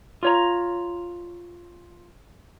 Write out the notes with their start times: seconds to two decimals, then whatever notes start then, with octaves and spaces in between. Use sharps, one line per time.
0.23 F4 C#5 A#5